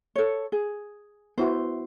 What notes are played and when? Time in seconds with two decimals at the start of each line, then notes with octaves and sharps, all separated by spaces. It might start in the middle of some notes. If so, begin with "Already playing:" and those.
0.16 A4 C#5
0.52 G#4
1.38 B3 E4 F#4 C5